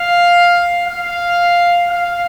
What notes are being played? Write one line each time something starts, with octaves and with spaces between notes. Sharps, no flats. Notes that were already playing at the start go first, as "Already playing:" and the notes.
Already playing: F5
F5
F5